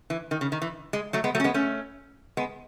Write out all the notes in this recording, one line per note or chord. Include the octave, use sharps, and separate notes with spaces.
E3
D#3
C#3
D#3
E3
G#3
F#3 A3
G#3 B3
F#3 A3
C#4
G#3 B3
A3 C#4
G#3 B3